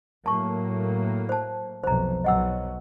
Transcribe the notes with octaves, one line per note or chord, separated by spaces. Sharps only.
A2 F#3 A#3 A5 C#6
C5 A5
F1 B1 F2 C5 A#5
B1 F#3 D#5 F#5 E6